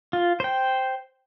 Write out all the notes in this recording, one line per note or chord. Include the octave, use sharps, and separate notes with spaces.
F4
C5 G5